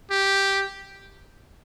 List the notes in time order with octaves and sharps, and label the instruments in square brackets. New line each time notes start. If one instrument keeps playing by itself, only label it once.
[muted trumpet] G4